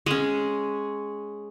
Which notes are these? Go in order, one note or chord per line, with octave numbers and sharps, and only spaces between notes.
G#3 C#4